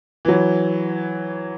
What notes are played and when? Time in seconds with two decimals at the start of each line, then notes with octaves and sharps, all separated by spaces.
0.25 E3 F#3